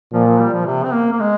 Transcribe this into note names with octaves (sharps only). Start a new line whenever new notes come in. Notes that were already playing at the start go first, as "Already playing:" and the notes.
A#2 F3
F3
G3
F3
C3
C4
A#3
A#3
G#3